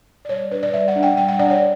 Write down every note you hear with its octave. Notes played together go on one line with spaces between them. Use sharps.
D5
G3 C#5
D4 B4
D5
G3 E5
F#5
D4
G5
G3 G5
F#5
D4 D5
C#5